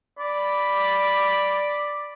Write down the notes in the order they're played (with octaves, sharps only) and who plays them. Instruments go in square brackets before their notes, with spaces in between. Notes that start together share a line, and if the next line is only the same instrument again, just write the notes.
[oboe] D5 [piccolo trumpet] B5